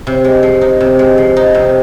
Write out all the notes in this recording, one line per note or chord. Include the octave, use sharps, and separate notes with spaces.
C3
G#3
F3
D#4
C3
G#3
F3
D#4
C3